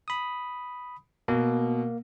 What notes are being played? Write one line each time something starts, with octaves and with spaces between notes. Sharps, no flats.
B5 D#6
B2 A#3